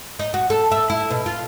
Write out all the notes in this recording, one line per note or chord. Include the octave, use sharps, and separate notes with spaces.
D#4
F#4
A4
E5
E4
B2
F4